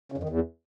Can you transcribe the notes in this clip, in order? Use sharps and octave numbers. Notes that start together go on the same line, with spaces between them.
C#3
F2
D#3
E2